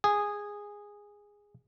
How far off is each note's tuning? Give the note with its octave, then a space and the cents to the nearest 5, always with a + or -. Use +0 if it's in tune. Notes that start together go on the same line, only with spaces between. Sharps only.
G#4 -10